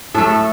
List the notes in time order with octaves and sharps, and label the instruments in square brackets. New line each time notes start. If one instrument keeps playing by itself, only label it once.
[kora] A2 A3 A4